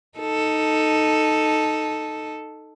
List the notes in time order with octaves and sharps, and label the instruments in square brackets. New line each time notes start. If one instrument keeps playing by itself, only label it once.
[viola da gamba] D#4 A4